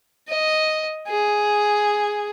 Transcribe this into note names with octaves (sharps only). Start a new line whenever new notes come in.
D#5
G#4